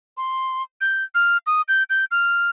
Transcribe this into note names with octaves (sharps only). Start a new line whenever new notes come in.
C6
G6
F6
D#6
G6
G6
F6